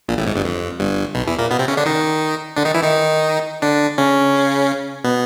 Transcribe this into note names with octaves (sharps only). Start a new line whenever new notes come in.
A#1 A#2
A1 A2
G#1 G#2
G1 G2
F2
G1 G2
B1 B2
E2 E3
A#2 A#3
B2 B3
C3 C4
C#3 C#4
D3 D4
D#3 D#4
D3 D4
D#3 D#4
E3 E4
D#3 D#4
D3 D4
C#3 C#4
B2 B3